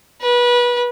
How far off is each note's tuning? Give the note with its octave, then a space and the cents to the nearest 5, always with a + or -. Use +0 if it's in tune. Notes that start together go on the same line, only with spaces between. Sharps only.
B4 -25